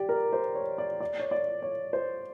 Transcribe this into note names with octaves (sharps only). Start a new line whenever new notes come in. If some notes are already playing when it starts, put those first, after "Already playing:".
Already playing: G4 D5
A#4
C5
C#5
D5
D5
C#5
D5
C#5
C5